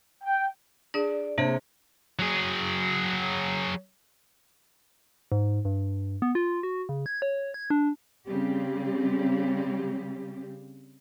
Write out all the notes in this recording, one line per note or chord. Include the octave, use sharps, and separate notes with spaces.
G5
D4 G#4 D5
C3 A#3 D4 G#4 C#5
F#3 G#4
G#2
G2
B3
F4
F#4
C#3
G#6
C#5
G#6
D4
C#3 G3 C4 G4